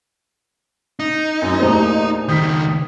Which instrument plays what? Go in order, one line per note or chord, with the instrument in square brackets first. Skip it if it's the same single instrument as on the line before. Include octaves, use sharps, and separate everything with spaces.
[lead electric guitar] D#4
[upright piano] F#2 F#3
[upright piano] E2 A#2 A#5 [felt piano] A3 G4 C5
[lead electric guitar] C#2 D#3 [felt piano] D#6 [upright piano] G6 B6